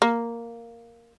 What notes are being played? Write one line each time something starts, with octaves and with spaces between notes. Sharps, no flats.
A#3